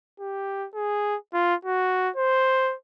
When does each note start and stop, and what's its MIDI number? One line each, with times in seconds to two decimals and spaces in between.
0.20 0.67 67
0.74 1.17 68
1.33 1.55 65
1.65 2.10 66
2.16 2.75 72